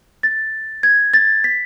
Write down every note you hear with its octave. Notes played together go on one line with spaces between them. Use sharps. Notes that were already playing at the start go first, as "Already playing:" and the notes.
A6
G#6
A6
B6